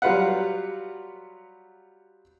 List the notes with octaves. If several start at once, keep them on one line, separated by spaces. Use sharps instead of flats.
F#3 G3 F4 B4 F5 F#5